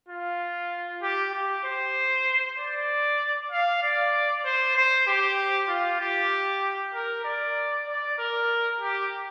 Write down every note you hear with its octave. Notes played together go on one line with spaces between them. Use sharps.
F4
G4
G4
C5
D5
F5
D5
C5
C5
G4
F4
G4
A#4
D5
D5
A#4
G4